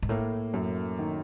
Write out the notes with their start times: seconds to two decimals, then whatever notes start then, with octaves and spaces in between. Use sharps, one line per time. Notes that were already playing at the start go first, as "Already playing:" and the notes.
0.03 G#2
0.09 A2 A#3
0.54 F#2
0.99 D#3